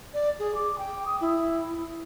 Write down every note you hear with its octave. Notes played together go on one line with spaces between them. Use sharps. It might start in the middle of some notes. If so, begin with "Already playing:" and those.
D5
G#4
D6
G5
D#6
E4